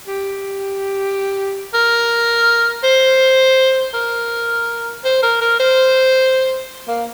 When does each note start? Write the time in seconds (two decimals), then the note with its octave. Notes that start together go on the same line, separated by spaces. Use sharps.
0.07 G4
1.74 A#4
2.84 C5
3.94 A#4
5.04 C5
5.23 A#4
5.41 A#4
5.59 C5
6.88 A#3